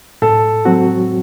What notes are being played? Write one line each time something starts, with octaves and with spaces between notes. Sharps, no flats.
A2 A4
F#3 C4 F#4